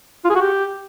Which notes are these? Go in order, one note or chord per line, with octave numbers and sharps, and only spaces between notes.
F4
G#4
F#4
G4